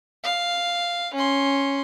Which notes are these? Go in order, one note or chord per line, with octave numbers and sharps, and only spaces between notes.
F5
C#4 C6